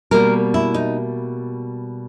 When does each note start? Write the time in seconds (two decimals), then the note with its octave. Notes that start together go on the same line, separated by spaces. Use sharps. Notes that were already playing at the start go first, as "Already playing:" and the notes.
0.11 B2 G3 A#3 A#4
0.54 E4
0.74 D#4